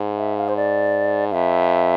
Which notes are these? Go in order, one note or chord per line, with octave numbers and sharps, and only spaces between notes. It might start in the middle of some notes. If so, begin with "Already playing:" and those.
Already playing: G#2
E5
F5
C5
D5
F2 E5 F5